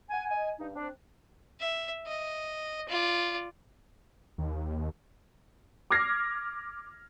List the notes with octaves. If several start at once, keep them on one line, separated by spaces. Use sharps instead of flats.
F#5 G#5
D#5 G#5
G2 D#4
C4 D4
E5
D#5
F4 D5
D#2
D6 F6 G#6 A#6 C7